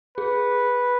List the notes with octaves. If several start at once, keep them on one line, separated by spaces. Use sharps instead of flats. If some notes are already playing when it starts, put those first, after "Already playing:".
G#4 B4